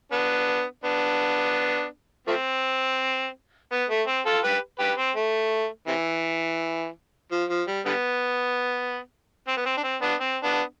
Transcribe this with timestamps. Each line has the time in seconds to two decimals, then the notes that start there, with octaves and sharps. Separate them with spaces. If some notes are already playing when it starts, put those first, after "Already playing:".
0.12 B3 D4
0.84 B3 D4
2.27 F3 A3 C4
3.72 B3
3.90 A3
4.07 C4
4.26 F4 A4
4.44 G4 B4
4.79 G4 B4
4.98 C4
5.16 A3
5.88 C3 E3
7.32 F3
7.50 F3
7.67 G3
7.86 D3 G3 B3
9.48 C4
9.57 B3
9.66 C4
9.77 D4
9.84 C4
10.02 B3 D4
10.20 C4
10.44 B3 D4